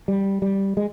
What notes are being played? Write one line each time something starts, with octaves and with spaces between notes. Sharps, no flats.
G3
G3
G#3